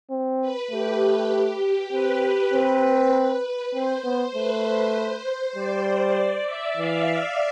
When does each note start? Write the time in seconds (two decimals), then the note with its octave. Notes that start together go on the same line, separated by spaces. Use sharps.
0.10 C4
0.41 B4
0.71 A3 G4
1.92 C4 B4
2.53 C4
3.13 B4
3.74 C4 C5
4.04 B3
4.35 A3 B4
4.95 C5
5.55 G3 D5
6.16 D5
6.46 E5
6.77 E3 F5